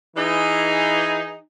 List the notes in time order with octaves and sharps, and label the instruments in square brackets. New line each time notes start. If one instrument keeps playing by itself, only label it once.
[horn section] E3 D#4 G#4